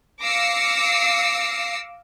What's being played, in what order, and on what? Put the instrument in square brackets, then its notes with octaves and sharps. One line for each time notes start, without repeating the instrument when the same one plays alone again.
[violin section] F5 D6 E6 A#6 C7 C#7